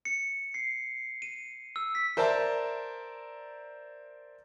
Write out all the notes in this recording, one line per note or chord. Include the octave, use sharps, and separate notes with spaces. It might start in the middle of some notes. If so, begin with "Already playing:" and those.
C#7
C7
D#7
E6
B6
A#4 C5 D5 E5 A5 A#5